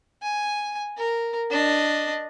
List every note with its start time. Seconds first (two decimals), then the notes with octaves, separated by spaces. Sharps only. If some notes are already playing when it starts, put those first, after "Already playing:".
0.22 G#5
0.97 A#4
1.50 D4 D#5